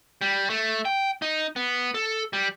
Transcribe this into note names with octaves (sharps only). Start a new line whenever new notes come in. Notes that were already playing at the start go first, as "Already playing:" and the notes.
G3
A3
G5
D#4
B3
A4
G3